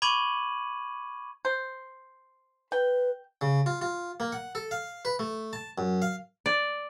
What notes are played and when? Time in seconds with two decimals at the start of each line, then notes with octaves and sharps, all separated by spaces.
0.02 B5 C#6 D6 G#6 D#7 F#7
1.45 C5
2.72 B4 G5
3.41 C#3
3.66 F4
3.81 F4
4.20 A#3
4.32 F#5
4.55 A4
4.71 F5
5.05 B4
5.19 A3
5.53 A5
5.78 F#2
6.02 F5
6.46 D5